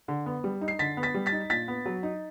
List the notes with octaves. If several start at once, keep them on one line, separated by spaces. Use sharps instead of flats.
D3
B3
G3
D#4
C7
D3 A6 B6
B3
A6 B6
G3
A6 B6
D#4
A#2 A6 B6
B3
F#3
D#4